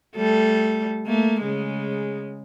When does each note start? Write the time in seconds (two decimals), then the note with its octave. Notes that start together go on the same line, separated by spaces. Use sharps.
0.16 G3 A3 A4
1.06 A3 A#3
1.42 C#3 G#3